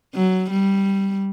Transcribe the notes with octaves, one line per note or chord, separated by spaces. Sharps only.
F#3
G3